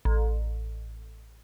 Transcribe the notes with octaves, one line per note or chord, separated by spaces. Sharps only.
A1